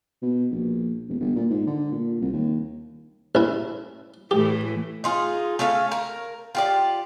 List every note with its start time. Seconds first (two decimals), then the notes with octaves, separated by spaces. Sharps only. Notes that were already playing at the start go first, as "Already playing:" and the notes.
0.22 B2
0.51 A#1
1.09 E1
1.20 G1
1.35 A#2
1.50 G#2
1.67 D3
1.92 A#2
2.21 C2
2.33 D#2
3.35 A1 E4
4.31 A2 E3 A3 G4
5.04 D#4 F4 G#4
5.59 A3 C#4 A4 F5
5.91 A#4
6.55 F4 G4 D5